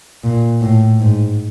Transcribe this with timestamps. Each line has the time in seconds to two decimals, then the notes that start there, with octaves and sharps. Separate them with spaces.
0.24 A#2
0.62 A2
1.00 G#2